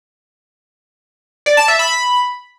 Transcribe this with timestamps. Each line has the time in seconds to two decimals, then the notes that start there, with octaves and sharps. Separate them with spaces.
1.46 D5
1.57 A5
1.68 E5
1.79 B5